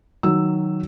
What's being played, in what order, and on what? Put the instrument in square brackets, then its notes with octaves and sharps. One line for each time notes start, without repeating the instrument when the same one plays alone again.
[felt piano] D#3 F#3 E6